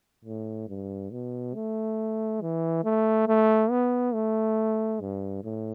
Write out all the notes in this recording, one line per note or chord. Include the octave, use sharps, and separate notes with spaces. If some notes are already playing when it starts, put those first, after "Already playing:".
A2
G2
B2
A3
E3
A3
A3
B3
A3
G2
A2